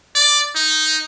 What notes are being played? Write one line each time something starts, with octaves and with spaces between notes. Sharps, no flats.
D5
D#4